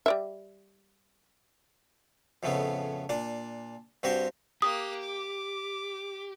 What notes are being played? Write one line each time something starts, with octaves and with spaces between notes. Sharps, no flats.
G3 D5 E5
F2 A2 C#3 A3 B3
A#2 D4 D5
G2 C4 F#4 G4 C5 C#6
A#3 G4 D#6 F#6
D6